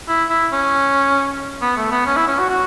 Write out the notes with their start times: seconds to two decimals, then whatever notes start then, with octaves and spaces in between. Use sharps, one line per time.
0.08 E4
0.30 E4
0.52 C#4
1.62 B3
1.77 A3
1.91 B3
2.06 C#4
2.17 E4
2.28 C#4
2.39 F#4
2.49 F#4